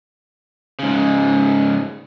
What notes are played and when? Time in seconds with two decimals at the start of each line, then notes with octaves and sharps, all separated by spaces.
0.79 G#2 C#3